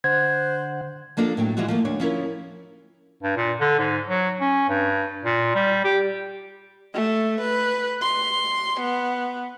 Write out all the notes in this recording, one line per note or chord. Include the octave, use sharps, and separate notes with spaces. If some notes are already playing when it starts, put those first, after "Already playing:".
D3 C5 F#5 G#6
F3 A#3 D4 F4 A4
A2 F#3 G5
E3 F3 G3 G#3 F4 F#4
F3 A3 A#3
D2 D4 C#5
F3 C#4 E4 A#4
G2
A#2
D3
G#2
F#3
C#4
G2
A#2
G3
G4
A3
B4
C6
B3